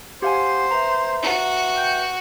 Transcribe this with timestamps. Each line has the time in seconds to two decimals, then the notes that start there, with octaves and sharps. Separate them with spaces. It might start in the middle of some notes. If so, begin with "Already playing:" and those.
0.22 G4 C5 F5 F#5 G#5
0.71 B4 E5 A#5
1.22 F#4
1.77 G5